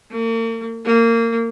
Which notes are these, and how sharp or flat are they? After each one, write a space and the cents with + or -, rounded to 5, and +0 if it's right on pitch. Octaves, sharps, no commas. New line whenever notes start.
A#3 -40
A#3 -25